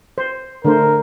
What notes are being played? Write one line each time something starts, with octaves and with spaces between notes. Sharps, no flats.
C5
D3 A3 A#4 C5